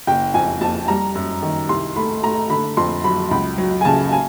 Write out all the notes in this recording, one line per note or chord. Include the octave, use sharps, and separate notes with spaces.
F#1 G5
F2 G#5
F2 A5
G3 A#5
F#2
D#3
C2 C6
A3 B5
A3 A#5
D3 B5
F2 C6
F#3 B5
C#2 B5
F#3
G#5
C#3 A5
G#5